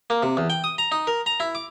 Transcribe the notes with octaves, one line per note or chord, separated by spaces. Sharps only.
A#3
C3
E2
G5
D#6
A#5
D#4
A#4
A#5
E4
D6